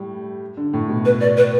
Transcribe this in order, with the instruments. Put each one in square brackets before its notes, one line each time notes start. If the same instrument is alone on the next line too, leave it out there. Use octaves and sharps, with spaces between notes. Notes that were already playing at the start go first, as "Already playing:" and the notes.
Already playing: [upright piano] A2 G3
D3
A2
B2
[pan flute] B4
D5
B4